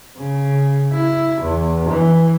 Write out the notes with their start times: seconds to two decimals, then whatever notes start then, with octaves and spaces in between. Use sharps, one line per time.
0.17 C#3
0.92 E4
1.41 E2
1.89 E3